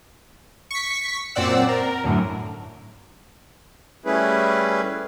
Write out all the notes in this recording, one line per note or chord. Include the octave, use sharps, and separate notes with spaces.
C#6 B6
F#2 A#2 C4 D5 F#5 E6
A#4
F#2 A2 D3 F#3
G3 A3 C#4 E4 G#4 B4